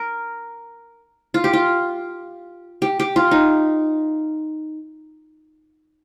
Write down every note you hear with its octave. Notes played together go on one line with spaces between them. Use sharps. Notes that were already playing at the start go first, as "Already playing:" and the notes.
Already playing: A#4
F4
G4
F4
G4
G4
F4
D#4